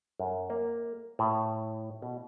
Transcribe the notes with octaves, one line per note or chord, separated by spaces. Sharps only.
F#2
A#3
A2
B2